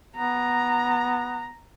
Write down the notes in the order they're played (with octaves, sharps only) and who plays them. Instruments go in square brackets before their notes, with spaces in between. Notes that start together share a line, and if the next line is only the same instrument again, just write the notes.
[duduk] B3 [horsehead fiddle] A#5